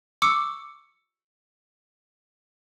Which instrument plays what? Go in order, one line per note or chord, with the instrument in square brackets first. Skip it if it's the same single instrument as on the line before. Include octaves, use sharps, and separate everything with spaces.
[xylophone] C#6 D6 E6 C#7